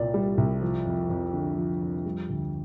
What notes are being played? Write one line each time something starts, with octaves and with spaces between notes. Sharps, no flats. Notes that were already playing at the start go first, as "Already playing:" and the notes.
Already playing: C2 A#2 D5
G3
C2
F3
F2
F2
D3
F3
F2
G3
D2